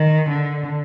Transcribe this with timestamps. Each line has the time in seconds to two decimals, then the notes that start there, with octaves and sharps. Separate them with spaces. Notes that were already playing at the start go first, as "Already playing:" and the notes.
Already playing: D#3
0.30 D3